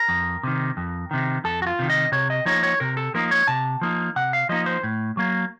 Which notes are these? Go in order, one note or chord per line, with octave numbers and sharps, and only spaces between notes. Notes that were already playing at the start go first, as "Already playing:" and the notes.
Already playing: A#4
F2
C3 D#3
F2
C3 D#3
F2 A4
F#4
F4
C3 D#3
D#5
C3 C#5
D#5
F3 A#3 D#4 C#5
C#5
C3 A#4
A4
F3 A#3 D#4 A#4
C#5
C3 A5
F3 A#3 D#4
C3 F#5
F5
F3 A#3 D#4 D#5
C5
A2
F#3 A#3